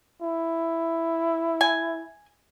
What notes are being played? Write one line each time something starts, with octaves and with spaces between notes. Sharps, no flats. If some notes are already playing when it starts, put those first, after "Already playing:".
E4
G#5